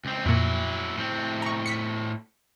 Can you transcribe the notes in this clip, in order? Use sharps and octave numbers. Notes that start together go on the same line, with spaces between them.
C#2 C4
F2 A#2 F#3 E4
A2 C4
A#5 C#6
B6 C#7